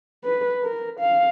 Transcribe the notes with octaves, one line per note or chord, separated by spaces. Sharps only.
B4
A#4
F5